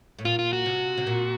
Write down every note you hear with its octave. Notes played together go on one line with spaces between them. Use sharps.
A2
A#2 F4
F4
F#4
C3
C3
A#2